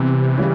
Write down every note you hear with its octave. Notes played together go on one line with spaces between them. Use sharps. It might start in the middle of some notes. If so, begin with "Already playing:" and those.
Already playing: C3 E3 G3 B3
C#3 E3 G3